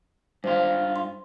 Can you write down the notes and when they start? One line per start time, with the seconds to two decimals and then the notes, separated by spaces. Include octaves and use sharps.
0.44 G2 F4 C5
0.96 C6